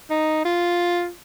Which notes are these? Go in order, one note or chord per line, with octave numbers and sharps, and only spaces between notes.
D#4
F4